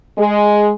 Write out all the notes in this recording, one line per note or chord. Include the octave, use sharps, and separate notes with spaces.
G#3